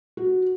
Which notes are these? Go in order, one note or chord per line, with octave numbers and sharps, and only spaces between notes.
F#4